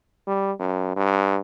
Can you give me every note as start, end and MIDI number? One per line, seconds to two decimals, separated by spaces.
0.27 0.52 55
0.59 0.95 42
0.96 1.38 43